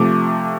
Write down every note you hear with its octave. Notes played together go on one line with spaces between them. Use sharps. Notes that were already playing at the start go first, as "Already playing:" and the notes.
Already playing: C3 F3 A3 D6